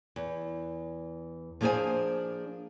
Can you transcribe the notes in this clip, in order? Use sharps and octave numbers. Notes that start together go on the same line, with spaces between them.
E2
F3 A#3 D4 G#4 C5 G#5